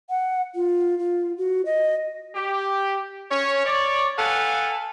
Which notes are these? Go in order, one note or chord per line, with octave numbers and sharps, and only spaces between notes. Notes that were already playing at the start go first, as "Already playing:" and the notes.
F#5
F4
F4
F#4
D#5
G4
C#4 C#5
C#5 D5
A4 B4 F5 F#5 G#5